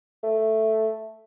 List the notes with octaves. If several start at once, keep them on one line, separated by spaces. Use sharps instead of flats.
A3